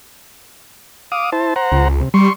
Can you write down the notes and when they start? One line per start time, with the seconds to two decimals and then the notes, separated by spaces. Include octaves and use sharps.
1.12 F5 D6 D#6
1.32 E4 C5 A5
1.56 C5 F#5 A#5
1.72 C#2
2.01 C3
2.14 G3 C6 C#6